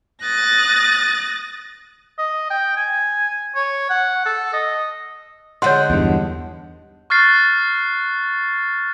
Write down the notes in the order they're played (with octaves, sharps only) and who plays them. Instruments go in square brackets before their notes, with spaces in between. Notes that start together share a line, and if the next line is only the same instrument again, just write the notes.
[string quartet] D#6 F#6 A6 A#6
[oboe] D#5
G5
G#5
C#5
F#5
A4
D#5
[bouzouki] D3 D#3 G#3 [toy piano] C#5 C6 [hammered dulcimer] F#5
[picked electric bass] E2 G2
[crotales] C#6 F6 F#6 A6 C7